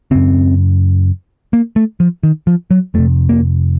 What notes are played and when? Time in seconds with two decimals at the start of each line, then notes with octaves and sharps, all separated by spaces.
0.11 F#2 C#3 C4
1.53 A#3
1.76 A3
2.00 F3
2.23 D#3
2.47 F3
2.71 F#3
2.94 F2 C3 A3
3.29 A#3